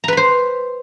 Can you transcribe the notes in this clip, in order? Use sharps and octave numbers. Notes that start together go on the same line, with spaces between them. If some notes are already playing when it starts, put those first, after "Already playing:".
B4 C5 A#5 B5